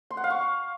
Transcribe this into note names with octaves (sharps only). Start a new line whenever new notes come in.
C6
F#5
F5
C#6